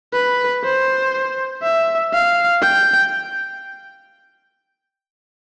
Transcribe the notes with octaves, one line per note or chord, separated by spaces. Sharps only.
B4
C5
E5
F5
G5